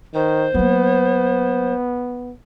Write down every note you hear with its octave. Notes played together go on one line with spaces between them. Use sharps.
D#3 C5
F#3 A#3 B3